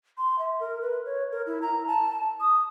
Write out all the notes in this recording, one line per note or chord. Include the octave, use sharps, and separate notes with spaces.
C6
E5
A#4
B4
C#5
A#4
E4
A#5
A5
D#6